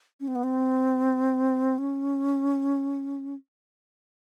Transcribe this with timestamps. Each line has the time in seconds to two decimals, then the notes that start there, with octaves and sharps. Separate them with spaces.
0.20 C#4
0.28 C4
0.35 B3
0.43 C4
1.78 C#4